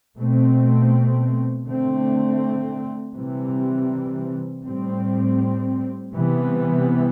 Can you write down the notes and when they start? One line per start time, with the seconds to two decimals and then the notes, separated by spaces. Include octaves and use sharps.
0.16 B2 A3 C4
1.65 D3 A3 C4
3.15 C3 E3 G3 C4
4.64 A2 G3 C4
6.13 C3 E3 G3 B3